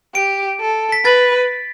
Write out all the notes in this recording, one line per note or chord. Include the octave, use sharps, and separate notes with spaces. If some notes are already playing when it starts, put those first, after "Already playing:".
G4 D7
A4
B6
B4 A6